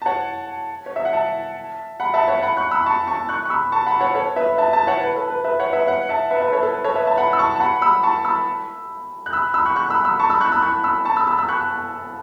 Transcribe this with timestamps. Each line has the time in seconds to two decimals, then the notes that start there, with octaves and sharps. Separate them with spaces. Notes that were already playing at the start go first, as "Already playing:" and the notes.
0.02 A5
0.06 C#5 F#5
0.86 C#5
0.96 E5
1.05 F#5
1.13 E5 A5
2.00 F#5 B5
2.14 E5 A5
2.28 C#5 F#5
2.42 F#5 B5
2.57 C#6 F#6
2.71 B5 E6
2.86 A5 C#6
3.07 A5 C#6
3.29 C#6 F#6
3.45 C#6
3.50 B5 E6
3.72 A5 C#6
3.86 F#5 B5
4.00 C#5 F#5
4.15 A4 C#5
4.36 B4 E5
4.58 E5 A5
4.73 E5 A5
4.87 C#5 F#5
5.02 B4
5.16 A4
5.30 B4
5.44 B4 E5
5.59 C#5 F#5
5.73 B4 E5
5.87 C#5 F#5
6.09 E5 A5
6.31 B4 E5
6.41 B4 E5
6.53 A4 C#5
6.63 A4
6.74 B4
6.84 A4 C#5
6.96 B4 E5
7.07 E5 A5
7.17 F#5 B5
7.33 E6
7.39 A5 C#6
7.56 A5
7.60 F#5 B5
7.82 B5 E6
8.03 A5 C#6
8.25 B5 E6
9.26 F#6
9.33 B5 E6
9.54 B5 E6
9.65 C#6 F#6
9.76 C#6 F#6
9.90 B5 E6
10.05 B5 E6
10.19 A5 C#6
10.30 B5 E6
10.40 C#6 F#6
10.52 B5 E6
10.62 C#6 F#6
10.84 B5 E6
11.05 A5 C#6
11.16 B5 E6
11.27 B5 E6
11.37 B5 E6
11.48 C#6 F#6